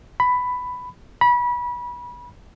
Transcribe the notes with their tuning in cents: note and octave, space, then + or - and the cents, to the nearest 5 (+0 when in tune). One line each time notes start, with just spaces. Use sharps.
B5 +10
B5 -25